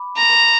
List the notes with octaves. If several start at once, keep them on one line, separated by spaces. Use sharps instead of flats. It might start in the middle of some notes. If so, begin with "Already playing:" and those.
Already playing: B5 D6
A#5